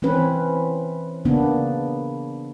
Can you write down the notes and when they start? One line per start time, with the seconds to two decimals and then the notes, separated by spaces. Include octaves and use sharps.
0.02 E3 C4 C#4 B4
1.25 C#3 A#3 B3 D4